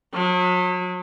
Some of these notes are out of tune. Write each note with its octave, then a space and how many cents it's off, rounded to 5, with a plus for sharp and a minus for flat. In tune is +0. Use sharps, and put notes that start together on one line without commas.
F#3 -40